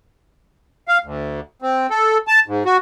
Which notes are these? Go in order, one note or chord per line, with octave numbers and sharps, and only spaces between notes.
F5
D2
C4
A4
A5
G#2
F#4